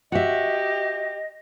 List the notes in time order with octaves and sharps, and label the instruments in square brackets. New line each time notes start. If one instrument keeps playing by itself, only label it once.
[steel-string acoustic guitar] F#4 E5 [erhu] G4 [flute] D#5